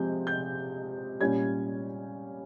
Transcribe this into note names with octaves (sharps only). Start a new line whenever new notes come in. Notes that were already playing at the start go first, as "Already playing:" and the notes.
Already playing: C3 F3 G#3 C4 G6
G6
A#2 G3 C#4 G#6